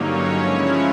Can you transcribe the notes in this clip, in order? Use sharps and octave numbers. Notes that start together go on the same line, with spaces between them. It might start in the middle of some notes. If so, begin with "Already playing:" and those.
Already playing: G2 D3 F#3 A#3 C#4 D#4 C#5
C#3 F3 G#3 C#4 E4